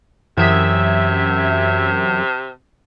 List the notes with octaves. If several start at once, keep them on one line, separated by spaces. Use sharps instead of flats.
F#2 C3 E3 E5 D#6 G#6